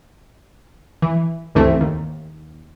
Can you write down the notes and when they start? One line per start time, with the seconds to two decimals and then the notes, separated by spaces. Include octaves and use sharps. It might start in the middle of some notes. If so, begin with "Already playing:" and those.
1.02 E3
1.55 C#2 G2 E3 A3 C4
1.81 D#2